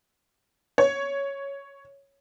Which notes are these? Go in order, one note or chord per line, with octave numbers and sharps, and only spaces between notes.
C#5